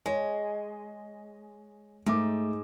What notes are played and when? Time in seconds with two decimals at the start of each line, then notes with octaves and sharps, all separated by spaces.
0.06 G#3 C#5
2.06 G#2 A3 D6